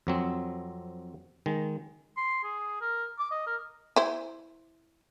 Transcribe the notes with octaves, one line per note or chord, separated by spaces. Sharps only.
F2 F#3 C4
D#3 G#3
C6
G#4
A#4
D6
D#5
A#4
E4 C5